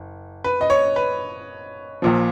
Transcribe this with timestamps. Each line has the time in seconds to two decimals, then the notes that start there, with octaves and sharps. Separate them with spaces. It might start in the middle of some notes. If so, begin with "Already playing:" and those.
Already playing: F#1
0.44 B4
0.61 D#5
0.70 C#5
0.96 B4
2.02 A#1 A#2 F3